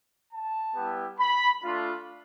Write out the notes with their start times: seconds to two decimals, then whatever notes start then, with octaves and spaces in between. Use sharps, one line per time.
0.32 A5
0.76 G3 B3 E4 G4
1.19 B5
1.62 A3 D4 F4